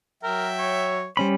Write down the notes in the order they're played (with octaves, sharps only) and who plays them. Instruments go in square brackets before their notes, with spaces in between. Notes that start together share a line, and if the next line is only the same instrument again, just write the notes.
[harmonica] F#3 E5 G5 [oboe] A#4
[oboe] C#5
[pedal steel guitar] G3 C#4 B5 [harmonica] C5